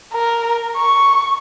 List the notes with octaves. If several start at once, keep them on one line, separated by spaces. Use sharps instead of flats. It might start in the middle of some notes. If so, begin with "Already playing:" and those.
A#4
C#6